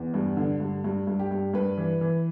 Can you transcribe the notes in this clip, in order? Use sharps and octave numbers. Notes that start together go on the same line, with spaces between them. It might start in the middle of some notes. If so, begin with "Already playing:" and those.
Already playing: E2
G2
D3
G2
G2
G2
G4
G2
G2 B4
E3
E3